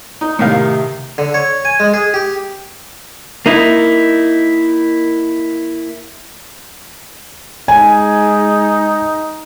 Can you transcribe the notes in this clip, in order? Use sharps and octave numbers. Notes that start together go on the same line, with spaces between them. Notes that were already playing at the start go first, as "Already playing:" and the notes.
D#4
A2 C3 D#3 F5
D3
C#5
G#5
G#3
G#4
G4
A#3 D#4 E4
G#3 D#4 G#5